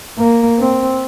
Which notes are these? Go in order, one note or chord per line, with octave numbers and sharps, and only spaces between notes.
A#3
C4